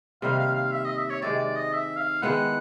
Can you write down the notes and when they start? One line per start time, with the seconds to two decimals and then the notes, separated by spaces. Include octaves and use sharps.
0.22 C3 D#3 G3 A#3 F5
0.39 F5
0.55 F5
0.72 E5
0.84 D#5
0.97 E5
1.10 C#5
1.22 C3 D#3 G#3 D5
1.39 D5
1.55 D#5
1.72 E5
1.97 F5
2.22 D#3 G#3 B3 E4 F#5